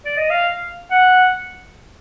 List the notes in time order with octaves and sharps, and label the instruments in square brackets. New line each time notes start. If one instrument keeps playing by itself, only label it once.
[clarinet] D5
D#5
F5
F#5